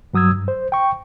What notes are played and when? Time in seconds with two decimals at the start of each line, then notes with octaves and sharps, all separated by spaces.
0.14 G2 F#3 D#6 E6 G#6
0.30 G2
0.48 C5
0.72 G5 C#6